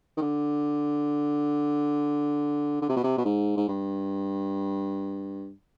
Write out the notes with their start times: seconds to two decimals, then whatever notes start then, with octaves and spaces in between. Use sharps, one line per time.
0.17 D#3
0.21 D3
2.82 D3
2.89 C3
2.96 B2
3.04 C3
3.18 B2
3.25 G#2
3.57 G#2
3.68 G2